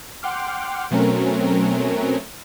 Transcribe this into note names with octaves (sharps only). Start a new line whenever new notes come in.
F#5 G5 C6 D6 F6
B2 F#3 A3 C4 C#4 A#4